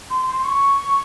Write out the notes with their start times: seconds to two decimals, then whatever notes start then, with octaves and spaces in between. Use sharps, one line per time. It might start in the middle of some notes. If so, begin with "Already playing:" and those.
0.10 C6
0.27 C6
0.44 C#6